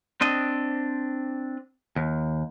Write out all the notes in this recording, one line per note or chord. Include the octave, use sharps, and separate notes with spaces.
C4 D4 D#5
D#2